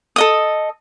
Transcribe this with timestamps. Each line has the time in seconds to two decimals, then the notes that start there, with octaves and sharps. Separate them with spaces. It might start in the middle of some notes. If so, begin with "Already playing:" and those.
0.16 A4 D#5 D#6